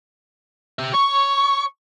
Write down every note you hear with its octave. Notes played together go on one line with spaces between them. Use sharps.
G4 E5
C#5 C#6